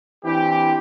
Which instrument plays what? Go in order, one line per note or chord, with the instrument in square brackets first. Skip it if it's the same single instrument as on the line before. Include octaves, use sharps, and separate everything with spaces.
[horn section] E3 C4 D4 G4